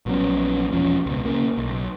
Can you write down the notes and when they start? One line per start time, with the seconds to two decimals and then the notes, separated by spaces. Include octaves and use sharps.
0.06 A#1 F#3 B3 C#4
0.72 E1 F3 C#4
1.06 C#2 B2
1.25 C#3 A#3
1.57 B1